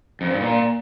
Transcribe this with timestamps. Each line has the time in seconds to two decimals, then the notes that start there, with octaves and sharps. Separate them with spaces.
0.21 F2
0.31 G2
0.41 A#2